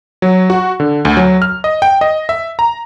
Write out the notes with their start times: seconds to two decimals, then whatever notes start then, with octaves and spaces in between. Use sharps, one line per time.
0.22 F#3
0.50 F#4
0.80 D3
1.05 D2
1.17 F#3
1.42 F6
1.64 D#5
1.82 G5
2.01 D#5
2.29 E5
2.59 A#5